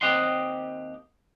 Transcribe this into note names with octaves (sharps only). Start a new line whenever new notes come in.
D#2 C4 G4 D#5 F#5 C6